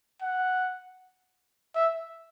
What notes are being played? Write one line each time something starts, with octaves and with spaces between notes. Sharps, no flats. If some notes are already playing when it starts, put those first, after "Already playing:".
F#5
E5